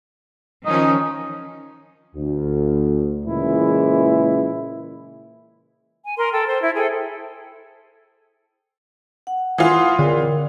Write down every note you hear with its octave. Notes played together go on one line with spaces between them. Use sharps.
D#3 F3 C#4 D#4
D2
A#2 C#3 E3 G#3 E4
G#5
A#4 C6
A4 G5
C5
E4 E5
G#4 A4 C5 G5
F#5
E3 F4 F#5 C6 D#6
D3 A#4 D5